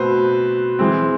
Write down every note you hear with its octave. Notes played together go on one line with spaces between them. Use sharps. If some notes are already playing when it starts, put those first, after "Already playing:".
Already playing: B2 A3 C4 B4 C5
E3 G#3 C4